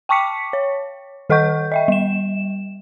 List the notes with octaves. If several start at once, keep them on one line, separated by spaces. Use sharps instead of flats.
G5 A5 C#6 D6 B6 C#7
C#5
D#3 A4 D#5 F#5 C#6 G6
D#5 E5 G5
G3 E7